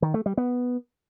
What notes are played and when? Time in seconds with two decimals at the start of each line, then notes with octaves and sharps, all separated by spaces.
0.02 D#3
0.14 A3
0.26 G3
0.37 B3